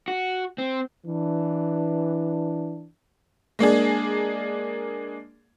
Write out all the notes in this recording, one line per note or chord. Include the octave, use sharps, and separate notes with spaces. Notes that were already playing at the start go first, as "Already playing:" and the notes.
F#4
C4
E3 D4
G#3 A#3 D4 G#4